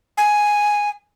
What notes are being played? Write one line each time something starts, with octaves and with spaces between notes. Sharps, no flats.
G#5